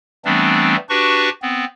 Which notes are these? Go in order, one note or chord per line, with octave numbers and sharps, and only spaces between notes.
E3 G3 A3 B3 C4 D4
D4 F#4 G4 B4 A5 C#6
B3 C4